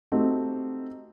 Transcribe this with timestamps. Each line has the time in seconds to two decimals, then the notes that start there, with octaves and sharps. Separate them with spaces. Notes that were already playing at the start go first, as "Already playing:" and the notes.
0.12 A3 C4 D#4 F#4 G4